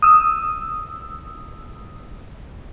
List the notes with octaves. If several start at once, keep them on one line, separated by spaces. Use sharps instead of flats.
D#6 E6